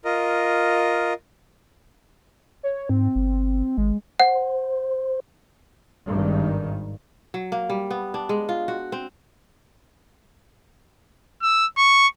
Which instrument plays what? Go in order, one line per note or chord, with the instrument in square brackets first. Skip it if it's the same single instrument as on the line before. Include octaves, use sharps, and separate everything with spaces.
[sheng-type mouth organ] F4 A#4 D#5
[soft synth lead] C#5
[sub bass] G#2 [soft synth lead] C4
[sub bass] G1
[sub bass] G#1 [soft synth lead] G#3
[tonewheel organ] C5 [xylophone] F#5
[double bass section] G#1 G2 D#3
[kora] F#3
A#3
G3
B3
D4
G#3
F4
F#4
C4
[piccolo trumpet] E6
C#6